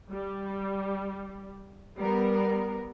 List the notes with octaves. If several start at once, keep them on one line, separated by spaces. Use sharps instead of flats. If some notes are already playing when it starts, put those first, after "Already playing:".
G3
G3 B3 A#4